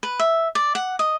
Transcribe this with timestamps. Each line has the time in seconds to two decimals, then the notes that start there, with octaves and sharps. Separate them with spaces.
0.03 B4
0.19 E5
0.55 D5
0.75 F#5
0.99 D#5